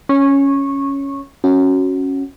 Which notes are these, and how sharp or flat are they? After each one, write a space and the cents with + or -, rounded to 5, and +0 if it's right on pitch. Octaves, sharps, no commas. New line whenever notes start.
C#4 +0 C#6 -15
C#4 -10 F#4 +0